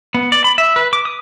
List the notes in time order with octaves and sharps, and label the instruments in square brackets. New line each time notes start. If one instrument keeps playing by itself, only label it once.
[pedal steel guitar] B3
D5
B5
E5
B4
D6
D#6